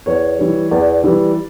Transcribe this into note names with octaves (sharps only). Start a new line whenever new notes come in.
E2 C#5
E3 G3
E2 D5
E3 G3